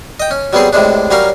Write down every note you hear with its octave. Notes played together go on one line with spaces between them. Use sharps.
D#5 G5
C#4
F#3 G3 B3 C4 G#4
A2 C3 G#3 D4
F#3 G3 C#4 A#4 F5